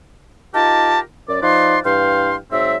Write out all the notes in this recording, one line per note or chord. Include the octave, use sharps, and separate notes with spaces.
D#4 F4 G4 A#4 A5
F#2 D5
F3 D#4 B4 D5 C6
G2 E3 F5 G5 C6
G#2 F#3 C4 E5